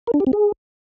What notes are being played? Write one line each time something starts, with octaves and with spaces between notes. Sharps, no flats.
A#4
D4
G4
C4
G#4